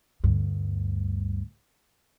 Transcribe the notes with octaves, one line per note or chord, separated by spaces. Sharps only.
D2 G2